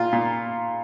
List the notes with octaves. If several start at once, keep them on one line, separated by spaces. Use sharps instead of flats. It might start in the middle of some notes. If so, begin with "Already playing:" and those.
Already playing: A#2 F4
A#2